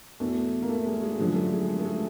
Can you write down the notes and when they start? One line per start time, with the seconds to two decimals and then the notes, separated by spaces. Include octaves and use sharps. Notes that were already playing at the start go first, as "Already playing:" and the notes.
0.20 E2 B2 A3
0.62 A#3
0.69 A3
0.86 G#3
1.02 G#3
1.19 F#2 D3 F3 G#3
1.35 A3
1.52 G#3
1.68 G#3
1.79 A3
1.84 G#3